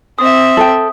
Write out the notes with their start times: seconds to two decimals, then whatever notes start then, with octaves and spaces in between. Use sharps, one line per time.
0.19 C4 E5 D#6
0.57 A4 G5